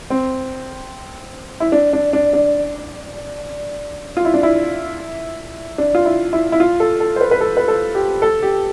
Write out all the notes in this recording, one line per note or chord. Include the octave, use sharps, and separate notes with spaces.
C4
E4
D4
D4
D4
D4
F4
E4
D4
E4
D4
F4
E4
E4
E4
F4
A4
A4
C5
B4
B4
A4
B4
A4
G4
A4
G4